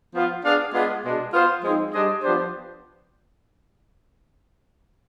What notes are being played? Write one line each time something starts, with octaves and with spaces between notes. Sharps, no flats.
F3 B3 F4
B3 D4 G#4 D5 F5
G#3 B3 D4 F4
B2 G#3 D4
B3 F4 C5 F5
F3 G#3 C4 D#4
G3 D4 G#4 C5 D#5
F3 B3 D4 G4 C5